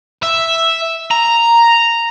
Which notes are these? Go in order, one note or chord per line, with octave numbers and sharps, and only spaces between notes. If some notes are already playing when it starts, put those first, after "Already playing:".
E5
A#5